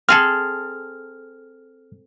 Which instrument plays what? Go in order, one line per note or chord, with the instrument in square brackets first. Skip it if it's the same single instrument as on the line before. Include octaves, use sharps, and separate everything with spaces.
[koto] C4 G#4 A4 [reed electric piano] F6